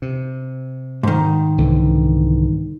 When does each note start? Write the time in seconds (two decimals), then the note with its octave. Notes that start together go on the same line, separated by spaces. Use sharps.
0.02 C3
1.03 G#2 D#3
1.58 C2 D3 E3